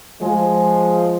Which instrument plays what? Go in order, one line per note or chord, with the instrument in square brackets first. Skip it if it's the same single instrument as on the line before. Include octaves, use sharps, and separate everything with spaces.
[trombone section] F3 G#3